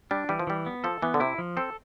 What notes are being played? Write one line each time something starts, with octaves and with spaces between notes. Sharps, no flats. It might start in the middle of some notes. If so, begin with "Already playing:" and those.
G3 D4
E3 G3
F3
E3 G3
B3
F3 A4
E3 B3
D3
C3 E4
F3
C4 A4